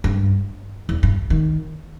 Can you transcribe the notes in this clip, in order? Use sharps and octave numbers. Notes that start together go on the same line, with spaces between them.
G2
E2
G2
D#3